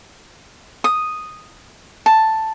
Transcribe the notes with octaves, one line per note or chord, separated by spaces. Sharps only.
D#6
A5